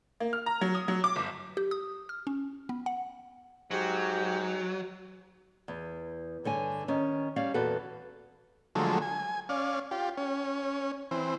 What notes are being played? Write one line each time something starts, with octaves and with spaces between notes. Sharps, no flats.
A#3
F6
A#5
F#3
D#6
F#3
D6
G1
G4
D#6
F6
C#4
B3
F#5
G#2 F#3 G4
E2
G2 D3 C#5 G#5
D#3 C#4
G3 C#4 D5 F5
E2 A#2 B3 F#4 A4 B4
D3 F3 F#3 G#3 A3
G#5
C#4 D5 F5
F4 G4
C#4
E3 C4